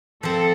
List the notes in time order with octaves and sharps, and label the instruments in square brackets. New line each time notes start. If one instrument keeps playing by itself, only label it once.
[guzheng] F3 C4 [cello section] A4